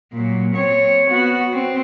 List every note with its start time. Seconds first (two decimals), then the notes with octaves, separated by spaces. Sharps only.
0.12 A#2 F#3
0.54 C4 C#5
1.10 B3 F#4
1.53 C4